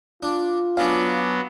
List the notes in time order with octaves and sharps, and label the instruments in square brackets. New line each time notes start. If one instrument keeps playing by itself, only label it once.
[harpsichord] D4 [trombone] F4
[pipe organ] F#3 B3 [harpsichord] C#4 D4 [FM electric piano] F5